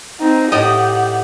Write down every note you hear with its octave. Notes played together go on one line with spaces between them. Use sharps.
C4 D#4
A2 G4 D#5 F#5